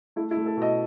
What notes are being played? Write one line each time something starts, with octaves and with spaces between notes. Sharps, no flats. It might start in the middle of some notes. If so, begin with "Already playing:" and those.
A3 E4
E4
A3
A4
B2 D#5